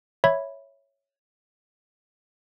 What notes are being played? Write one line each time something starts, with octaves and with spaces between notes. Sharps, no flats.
C#5 E5 B5 G#6